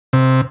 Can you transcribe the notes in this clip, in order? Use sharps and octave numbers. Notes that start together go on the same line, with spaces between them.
C3